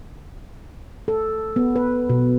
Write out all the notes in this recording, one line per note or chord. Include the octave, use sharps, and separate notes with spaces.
A4
B3
B4
B2